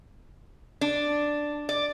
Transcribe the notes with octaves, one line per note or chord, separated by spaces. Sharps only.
D4
D5